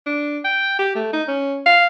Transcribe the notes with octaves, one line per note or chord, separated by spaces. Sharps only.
D4
G5
G4
A3
D#4
C#4
F5